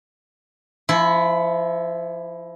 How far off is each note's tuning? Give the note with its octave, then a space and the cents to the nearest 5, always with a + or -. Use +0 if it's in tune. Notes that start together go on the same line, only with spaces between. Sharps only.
F3 -30 E4 +0